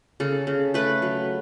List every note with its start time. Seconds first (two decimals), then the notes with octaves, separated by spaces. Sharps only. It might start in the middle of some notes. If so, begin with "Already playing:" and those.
0.20 C#3 A4
0.47 C#3
0.74 A3 B4
1.02 F#3